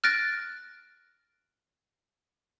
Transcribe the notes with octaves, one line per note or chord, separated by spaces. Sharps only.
F6 F#6 A6 A#6 D7